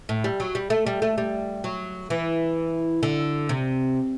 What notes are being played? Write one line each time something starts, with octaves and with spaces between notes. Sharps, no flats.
A2
G3
F#3
G3
A3
G3
A3
G3
F#3
E3
D3
C3